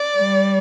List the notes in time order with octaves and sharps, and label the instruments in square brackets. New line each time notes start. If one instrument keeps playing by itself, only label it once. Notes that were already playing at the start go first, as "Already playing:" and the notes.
Already playing: [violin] D5
[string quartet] G3